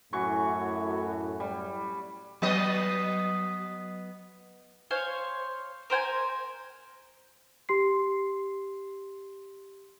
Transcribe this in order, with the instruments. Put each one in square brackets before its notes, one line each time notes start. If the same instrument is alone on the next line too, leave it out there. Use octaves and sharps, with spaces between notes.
[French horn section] F#2 A2 [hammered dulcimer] E3 F#4 C#6
[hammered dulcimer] G3
[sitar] F#3 B3 D#5
[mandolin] C5 C#5 F5 G#5
A#4 C5 G5 G#5
[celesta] G4 C6 C7